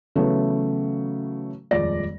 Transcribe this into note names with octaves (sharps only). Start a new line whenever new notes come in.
C#3 E3 F#3 A3 B3
D#1 F2 G#3 D5 A#6